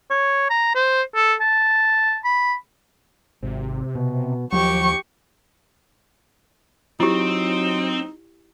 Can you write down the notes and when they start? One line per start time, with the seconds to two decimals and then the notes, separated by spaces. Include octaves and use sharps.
0.10 C#5
0.50 A#5
0.75 C5
1.15 A4
1.41 A5
2.24 B5
3.42 G#1 C3
3.95 B2
4.52 D#2 F3 F#3 G4 C#6
7.00 F#3 C4 D#4 E4 G4